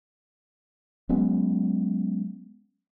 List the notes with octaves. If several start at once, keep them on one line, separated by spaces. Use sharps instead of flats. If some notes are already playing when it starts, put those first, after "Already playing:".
F#3 G#3 B3 C#4